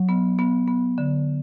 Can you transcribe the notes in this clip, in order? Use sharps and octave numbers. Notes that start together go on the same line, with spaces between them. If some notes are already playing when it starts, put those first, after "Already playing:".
Already playing: F#3
B3
B3
B3
D3